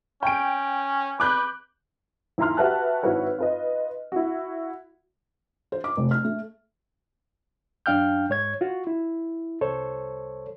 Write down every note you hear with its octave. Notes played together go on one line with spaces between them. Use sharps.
C#4 G5 D7
B4 D6 F#6 G6
D#2 E4 F4 A#5 C6 F6
F#4 G4 B4 E5 A5 F#6
G#1 E4 F#4 B4 C#5
F4 B4 D#5
E4 F#4
C5
D6
F1
F6
A3
F#2 D4 F5 G5 F6 G6
G#2 C#5 G#6
F4 F#4
E4
C2 A4 C5 C#5